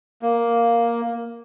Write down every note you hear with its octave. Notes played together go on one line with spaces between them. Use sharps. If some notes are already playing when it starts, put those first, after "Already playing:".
A#3